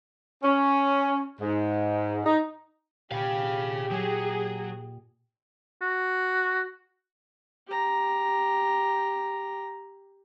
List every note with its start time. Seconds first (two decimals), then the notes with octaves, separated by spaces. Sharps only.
0.43 C#4
1.41 G#2
2.25 D#4
3.12 A#2 G4 G#4 F5
3.91 F#3 G#4
5.82 F#4
7.67 G4 A#5